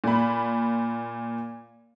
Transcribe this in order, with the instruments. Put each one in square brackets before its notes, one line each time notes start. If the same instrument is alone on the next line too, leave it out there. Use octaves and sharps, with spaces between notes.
[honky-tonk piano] A#2 B5